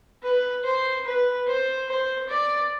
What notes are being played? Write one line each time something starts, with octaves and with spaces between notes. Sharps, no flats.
B4
C5
B4
C5
C5
D5